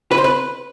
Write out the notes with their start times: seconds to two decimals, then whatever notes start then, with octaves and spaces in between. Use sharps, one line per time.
0.11 B4
0.18 C5
0.24 B4